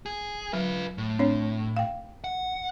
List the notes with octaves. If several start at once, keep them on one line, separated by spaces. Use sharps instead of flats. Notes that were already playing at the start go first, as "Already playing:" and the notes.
G#4
F#3 F4 B4
A2
C4 D4 C#5
F5 G5
F#5